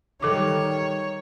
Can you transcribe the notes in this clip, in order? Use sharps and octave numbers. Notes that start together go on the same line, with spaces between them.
D#3 G3 A4 C#5 D6